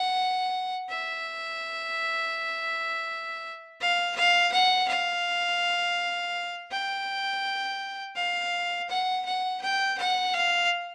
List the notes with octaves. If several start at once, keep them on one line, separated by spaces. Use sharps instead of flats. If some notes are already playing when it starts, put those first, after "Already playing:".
Already playing: F#5
E5
F5
F5
F#5
F5
G5
F5
F#5
F#5
G5
F#5
F5